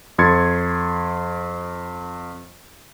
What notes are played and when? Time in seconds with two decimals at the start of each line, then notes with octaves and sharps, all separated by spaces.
0.18 F2 C6 G#6 A6 C#7